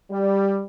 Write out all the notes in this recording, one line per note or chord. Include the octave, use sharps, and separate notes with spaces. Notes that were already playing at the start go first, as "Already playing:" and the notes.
G3